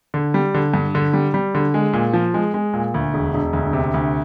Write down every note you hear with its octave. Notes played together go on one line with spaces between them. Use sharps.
D3
G3
D3
G2
D3
G3
G3
D3
G#3
A#2
F3
G#3
G#3
A#2
D2
E1
E1
D2
C3
D2